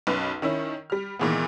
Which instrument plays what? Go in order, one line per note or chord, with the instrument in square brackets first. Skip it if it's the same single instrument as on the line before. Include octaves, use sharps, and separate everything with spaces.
[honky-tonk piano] B1 F#2 B4
D#3 C#4 E4
G3 F6
A#2 D#3 E3 G#3 B3